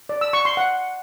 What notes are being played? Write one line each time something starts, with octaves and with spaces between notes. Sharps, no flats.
D5
E6
C#6
C6
F#5